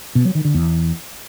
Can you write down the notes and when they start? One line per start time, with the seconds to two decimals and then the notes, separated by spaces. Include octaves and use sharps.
0.15 B2
0.25 F#3
0.35 D#3
0.45 D3
0.54 E2